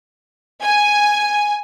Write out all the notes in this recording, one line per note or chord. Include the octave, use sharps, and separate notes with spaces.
G#5